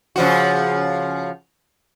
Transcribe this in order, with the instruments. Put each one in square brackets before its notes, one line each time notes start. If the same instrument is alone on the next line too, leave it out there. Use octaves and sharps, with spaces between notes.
[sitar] C#3 F3 F#4